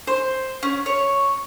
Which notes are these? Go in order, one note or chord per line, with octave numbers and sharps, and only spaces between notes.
C5
C#4
C#5